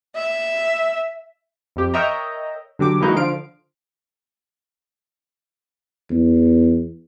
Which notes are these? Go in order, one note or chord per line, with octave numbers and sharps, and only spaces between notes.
E5
F2 G4
A#4 C#5 D#5 E5 G5 A#5
D3 F#3 G4 D6
E3 G#3 A#3 D#4 E4 F#4
D3 F3 F5 D7
E2